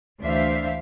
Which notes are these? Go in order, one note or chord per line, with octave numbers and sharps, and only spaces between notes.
D2 E3 D4 C5 E5 F5